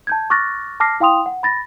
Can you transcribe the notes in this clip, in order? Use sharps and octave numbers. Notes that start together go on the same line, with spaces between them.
A5 G6 G#6
C#6 D6 F6 F#6 A6 A#6
A5 D6 F6 A#6 C7
E4 F5 G5 C6 D#6 F7
F#5
B5 A6 A#6